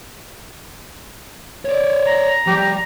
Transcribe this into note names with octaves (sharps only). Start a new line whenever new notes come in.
C#5 D5
A#5
F3 G3 G4